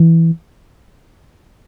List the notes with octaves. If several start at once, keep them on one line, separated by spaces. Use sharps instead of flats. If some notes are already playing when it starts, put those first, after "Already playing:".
Already playing: E3